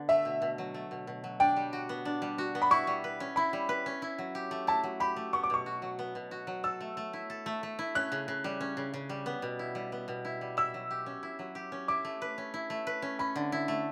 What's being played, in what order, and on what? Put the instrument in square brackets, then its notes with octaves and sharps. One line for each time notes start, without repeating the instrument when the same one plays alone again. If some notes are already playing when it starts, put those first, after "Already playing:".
Already playing: [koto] D3 B3
[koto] A3 [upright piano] E5
[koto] B2
B2
F#3
A3
B2
B2
F#3
[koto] D4 [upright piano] G5
[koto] G3
F#4
B3
D4
G3
F#4
B3
[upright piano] B5
[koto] E4 [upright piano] C#6
[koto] G3
B4
C#4
[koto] E4 [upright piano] B5
[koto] G3
B4
C#4
E4
F#3
G4
A3
[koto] E4 [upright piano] A5
[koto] F#3
[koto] G4 [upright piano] B5
[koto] A3
[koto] B3 [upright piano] C#6
[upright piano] D6
[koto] B2 [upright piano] C#6
[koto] F#4
F#3
B3
B2
F#4
F#3
[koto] A4 [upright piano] E6
[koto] A3
A3
E4
A4
A3
A3
E4
[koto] C#4 [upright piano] F#6
[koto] C#3
C#3
G3
C#4
C#3
C#3
G3
B3
B2
E4
G3
B3
B2
E4
G3
[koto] E4 [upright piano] E6
[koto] F#3
G4
C#4
E4
F#3
G4
C#4
[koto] E4 [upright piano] D6
[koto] A3
B4
C#4
E4
A3
B4
C#4
[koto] C#4 [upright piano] B5
[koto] D3
E4
A3